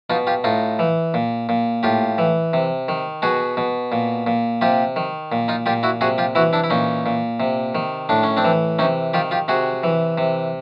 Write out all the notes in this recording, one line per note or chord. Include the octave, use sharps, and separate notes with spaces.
B2 D#4 F4
F4 G4
A2 D#4 F4
E3
A#2
A#2
A2 F4 G4
E3
C3
D#3
B2 F#4 G#4
B2
A#2
A#2
C3 F4 G4
D#3
A#2
D#4 F4
A#2 F4 G4
E4 F#4
C3 F#4 G#4
F4 G4
E3 E4 F#4
D4 E4
E4
A#2 C#4 D#4
A#2
C3
D#3
A2 D4
C#4
C4 D4
E3
C3 C#4 D#4
D#3 F4 G4
F4 G4
C3 F#4 G#4
E3
C3